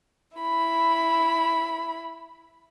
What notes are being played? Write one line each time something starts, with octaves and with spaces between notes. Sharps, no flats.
E4 B5